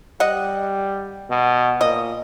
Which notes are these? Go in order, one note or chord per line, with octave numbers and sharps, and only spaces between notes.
G3 D#5 F#5
B2
A#2 D#5